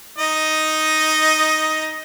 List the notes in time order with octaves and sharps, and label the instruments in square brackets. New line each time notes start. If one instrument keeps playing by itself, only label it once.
[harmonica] D#4 D#5